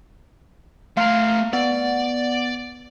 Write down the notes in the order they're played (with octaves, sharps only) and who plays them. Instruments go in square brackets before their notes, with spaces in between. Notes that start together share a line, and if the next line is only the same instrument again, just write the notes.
[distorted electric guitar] A3 A#5 [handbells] F5 C6 F6
[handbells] B3 [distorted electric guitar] D5